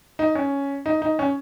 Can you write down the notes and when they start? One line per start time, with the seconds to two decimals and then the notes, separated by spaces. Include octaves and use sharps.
0.19 D#4
0.35 C#4
0.86 D#4
1.02 D#4
1.19 C#4